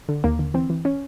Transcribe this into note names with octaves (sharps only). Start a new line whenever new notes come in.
D3
D#2 A#3
D3
E3 C4
E3
C#4